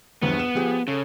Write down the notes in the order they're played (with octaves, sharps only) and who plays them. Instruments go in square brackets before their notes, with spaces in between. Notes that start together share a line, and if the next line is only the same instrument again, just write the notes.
[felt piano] A#1 E2 G2 [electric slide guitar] B3
[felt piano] E7
F3 G4 G#4
[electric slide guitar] C#3 [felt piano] A4